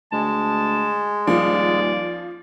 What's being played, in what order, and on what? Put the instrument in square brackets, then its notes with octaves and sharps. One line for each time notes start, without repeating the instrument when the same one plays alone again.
[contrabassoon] D2 [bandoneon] G#3 [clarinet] A5
[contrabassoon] D#1 [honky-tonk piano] F3 [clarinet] D5